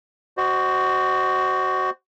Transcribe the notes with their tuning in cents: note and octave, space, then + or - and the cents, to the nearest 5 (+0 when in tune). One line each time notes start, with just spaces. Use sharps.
F#4 +15 C5 +0 D#5 -30